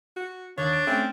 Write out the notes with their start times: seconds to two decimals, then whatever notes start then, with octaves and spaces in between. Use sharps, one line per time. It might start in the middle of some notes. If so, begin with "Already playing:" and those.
0.16 F#4
0.58 D#2 D4 C#5
0.73 D7
0.87 A3 C4 C#4